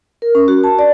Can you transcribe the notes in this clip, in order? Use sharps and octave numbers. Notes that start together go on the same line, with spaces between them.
A#4
C#4
F#4
A5
D5